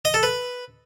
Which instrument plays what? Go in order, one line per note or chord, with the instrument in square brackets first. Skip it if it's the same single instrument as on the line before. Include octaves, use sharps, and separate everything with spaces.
[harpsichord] D#5
A4
B4